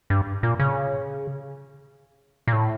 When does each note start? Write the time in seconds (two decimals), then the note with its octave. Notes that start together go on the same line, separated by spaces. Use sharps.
0.10 G2
0.43 A#2
0.60 C#3
2.47 A#2
2.53 A2